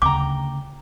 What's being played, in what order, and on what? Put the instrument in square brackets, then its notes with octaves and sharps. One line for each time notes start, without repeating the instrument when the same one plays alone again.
[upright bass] D2 C#3 [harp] G5 A#5 [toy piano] D6